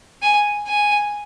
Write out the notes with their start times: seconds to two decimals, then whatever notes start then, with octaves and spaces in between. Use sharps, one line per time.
0.22 G#5
0.67 G#5